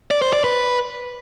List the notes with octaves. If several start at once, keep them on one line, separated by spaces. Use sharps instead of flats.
D5
C5
D5
B4